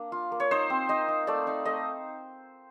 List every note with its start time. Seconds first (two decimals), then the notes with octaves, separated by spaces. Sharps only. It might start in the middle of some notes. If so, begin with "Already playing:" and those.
Already playing: A#3 D4
0.12 F4
0.32 A#3
0.40 C#5
0.51 D#4 C5
0.70 C4
0.89 D#4 D#5
1.08 D#4
1.27 A3 D5
1.47 D#4
1.65 A3 D#5